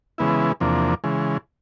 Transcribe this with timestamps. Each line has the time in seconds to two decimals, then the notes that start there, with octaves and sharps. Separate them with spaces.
0.18 C#3 E3 G#3 B3 E4
0.60 E2 C3 F3 A#3 D4
1.04 C#3 E3 G#3